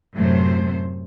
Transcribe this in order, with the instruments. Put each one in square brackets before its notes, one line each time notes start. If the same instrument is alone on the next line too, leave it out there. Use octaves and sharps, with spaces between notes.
[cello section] F#2 A2 C3 F#3 A3 C5